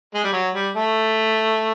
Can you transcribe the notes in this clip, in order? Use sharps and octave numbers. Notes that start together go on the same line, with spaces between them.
G#3
G3
F#3
G3
A3